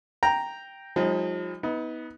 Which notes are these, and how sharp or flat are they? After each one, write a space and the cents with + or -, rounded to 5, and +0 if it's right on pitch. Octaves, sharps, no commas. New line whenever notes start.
G5 +0 A#5 +0
F3 +35 G#3 -40 D#4 +25
B3 +0 D#4 +35